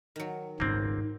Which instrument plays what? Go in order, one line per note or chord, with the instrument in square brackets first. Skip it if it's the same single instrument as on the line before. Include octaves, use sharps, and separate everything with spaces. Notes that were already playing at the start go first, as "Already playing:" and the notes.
[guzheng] D#3 F#3
[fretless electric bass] D#1 G#1 C#2 [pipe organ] G#2 [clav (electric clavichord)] A#3 C4